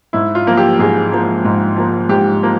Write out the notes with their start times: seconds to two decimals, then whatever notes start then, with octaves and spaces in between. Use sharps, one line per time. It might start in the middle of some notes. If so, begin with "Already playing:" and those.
0.13 G#2 E4
0.35 F4
0.47 F3 A#3
0.57 G4
0.79 G#2 G#4
1.12 F3 A#3
1.45 G#2
1.76 F3 A#3
2.09 G#2 G4
2.43 F3 A#3